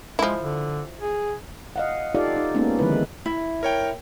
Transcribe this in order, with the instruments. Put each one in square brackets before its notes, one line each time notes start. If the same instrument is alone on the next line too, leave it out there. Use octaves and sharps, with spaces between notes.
[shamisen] F3 E4 [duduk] G#3
[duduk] D3
G#4
[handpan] D#5 F5 F#5
D#4 F4 G4 A4 D5 F5
D#4
G#3 A#3 B3 C#4 D#4
D3 D#3 F3 G#3 E4 B4
[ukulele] E4
[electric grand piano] A#4 C#5 G5